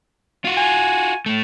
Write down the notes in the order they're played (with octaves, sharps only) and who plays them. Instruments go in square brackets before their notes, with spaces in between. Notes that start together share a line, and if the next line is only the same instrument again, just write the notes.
[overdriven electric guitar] F4 F#4
[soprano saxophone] G#5
[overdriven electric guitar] A2 A3